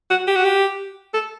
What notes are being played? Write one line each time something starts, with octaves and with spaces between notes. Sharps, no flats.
F#4
G4
F#4
G4
A4